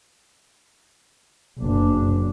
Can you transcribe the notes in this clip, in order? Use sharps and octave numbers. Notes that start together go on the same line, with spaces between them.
F#1 D4